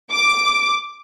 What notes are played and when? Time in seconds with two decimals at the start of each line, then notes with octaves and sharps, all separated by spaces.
0.11 D6